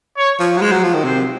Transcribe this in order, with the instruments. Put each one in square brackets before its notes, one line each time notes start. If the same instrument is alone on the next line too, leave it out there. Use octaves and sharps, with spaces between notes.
[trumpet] C#5
[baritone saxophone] F3
F#3
[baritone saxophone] G#3 [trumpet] C5
[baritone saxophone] F#3
F3
D#3
[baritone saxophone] C3 [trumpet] C5